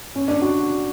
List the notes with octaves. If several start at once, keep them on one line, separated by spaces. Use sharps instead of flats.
C#4
D4
F#4